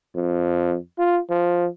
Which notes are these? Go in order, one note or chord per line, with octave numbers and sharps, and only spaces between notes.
F2
F4
F3